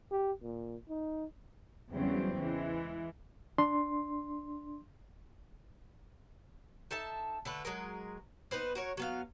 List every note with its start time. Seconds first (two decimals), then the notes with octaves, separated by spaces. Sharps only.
0.11 G4
0.42 A#2
0.89 D#4
1.91 E2 C#3 F#3 G3 C4
2.39 E3 G#3
3.58 D4 C6
6.91 D#4 A4 E5 A5
7.45 D3 A3 B4
7.65 F#3 G#3 A#4
8.51 B3 D#4 B4 C5
8.75 F#4 A#4 C#5
8.97 F#3 B3 F5